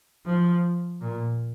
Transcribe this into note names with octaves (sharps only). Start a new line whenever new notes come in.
F3
A#2